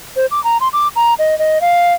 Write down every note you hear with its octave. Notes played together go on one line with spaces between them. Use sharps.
C5
D6
A#5
C6
D6
A#5
D#5
D#5
F5